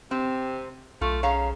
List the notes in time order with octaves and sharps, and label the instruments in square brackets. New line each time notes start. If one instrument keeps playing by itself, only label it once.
[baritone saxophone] C3 [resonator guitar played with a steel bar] C4
[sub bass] B1 [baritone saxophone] A3 [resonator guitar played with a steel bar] F4
[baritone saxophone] C#3 [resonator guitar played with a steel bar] C#5 F5 A#5